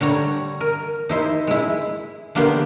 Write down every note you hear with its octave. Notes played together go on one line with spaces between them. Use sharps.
D3 G3 C#5 A#5
A#4
D#4 E4 C5
G#3 E4
D3 A#3 B3 G4 C5